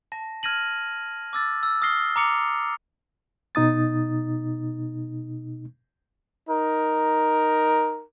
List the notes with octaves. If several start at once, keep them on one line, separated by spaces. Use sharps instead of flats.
A5 A#6
F6 G#6 A#6 D#7 F#7
D6 E6 A6
E6
D#6 F6 A#6 C7 G7
A#5 D6 C#7 F7
B2 D#4 D#6 A6
D#4 A#4